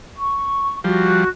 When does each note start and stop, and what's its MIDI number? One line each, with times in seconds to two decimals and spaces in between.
0.16 0.76 85
0.84 1.24 53
0.84 1.24 55
0.84 1.26 66